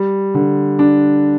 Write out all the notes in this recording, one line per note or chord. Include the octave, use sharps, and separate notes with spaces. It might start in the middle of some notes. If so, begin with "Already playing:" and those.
Already playing: G3
D3
D4